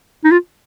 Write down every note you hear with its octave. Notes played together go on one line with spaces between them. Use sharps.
D#4
F4